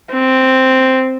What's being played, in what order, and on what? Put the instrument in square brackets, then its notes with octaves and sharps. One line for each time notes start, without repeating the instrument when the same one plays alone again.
[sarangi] C4